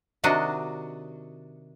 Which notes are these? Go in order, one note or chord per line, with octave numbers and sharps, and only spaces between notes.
C3 D#3 D4 F#4 D#5